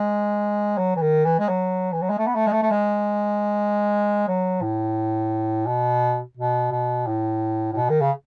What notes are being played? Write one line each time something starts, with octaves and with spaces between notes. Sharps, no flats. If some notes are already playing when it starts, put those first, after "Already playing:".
Already playing: G#3
F#3
E3
D#3
E3
G#3
F#3
E3
F#3
G#3
A3
B3
A3
G#3
A3
A3
G#3
F#3
A2
B2
B2
B2
A2
A2
B2
D#3
C#3